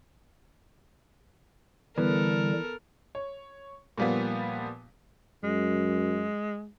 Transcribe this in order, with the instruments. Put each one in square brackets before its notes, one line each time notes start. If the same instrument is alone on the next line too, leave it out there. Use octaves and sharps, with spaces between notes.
[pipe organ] D3 G3 [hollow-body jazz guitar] E3 [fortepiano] B3 [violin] A4 A#4
[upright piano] C#5
A#2 F3 G3 A#3 B3
[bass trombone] F#2 [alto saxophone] G#3